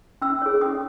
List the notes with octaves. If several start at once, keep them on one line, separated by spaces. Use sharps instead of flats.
C#4 E6
G#4 C#5
C#4 D#6